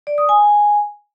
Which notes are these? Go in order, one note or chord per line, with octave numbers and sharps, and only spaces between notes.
D5
D#6
G#5